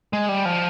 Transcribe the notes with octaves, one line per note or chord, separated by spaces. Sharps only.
G#3
G3
F3